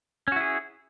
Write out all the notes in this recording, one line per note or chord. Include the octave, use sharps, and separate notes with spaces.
C#4 E4 F#4 G#4